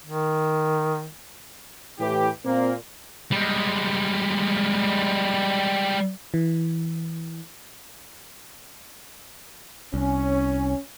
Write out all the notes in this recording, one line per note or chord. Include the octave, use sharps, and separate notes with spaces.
D#3
A2 E3 G4
A#2 A#3 C4
G3 G#3
E3
C2 C#4